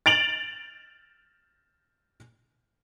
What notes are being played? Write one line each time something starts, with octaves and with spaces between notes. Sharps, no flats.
A6 D7 F7 F#7